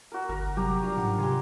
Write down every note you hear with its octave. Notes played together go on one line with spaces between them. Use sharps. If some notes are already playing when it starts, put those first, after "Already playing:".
F#4 A#4
G1 A#4
C3 F#3 G3 G4 A#5
D4 F4
G#2 F#5
C3 G4 G#5 C6